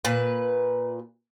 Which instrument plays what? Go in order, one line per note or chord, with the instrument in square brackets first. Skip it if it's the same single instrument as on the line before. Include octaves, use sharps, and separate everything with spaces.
[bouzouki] A#2 B4